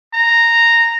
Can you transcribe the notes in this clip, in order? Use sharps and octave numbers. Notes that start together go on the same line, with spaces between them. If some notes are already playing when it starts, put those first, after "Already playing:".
A#5